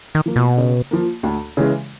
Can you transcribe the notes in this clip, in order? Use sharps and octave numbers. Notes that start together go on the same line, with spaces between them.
D#3
F3 A#3
B2
C#3
F3 A#3
D2
C#3 E3 G#3